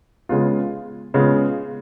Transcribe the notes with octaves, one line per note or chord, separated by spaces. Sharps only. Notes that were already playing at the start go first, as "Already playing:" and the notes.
C#3 G#3 B3 F4
C#3 G#3 B3 F4